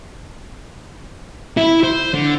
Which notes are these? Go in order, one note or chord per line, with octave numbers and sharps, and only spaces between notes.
E4
C5
D3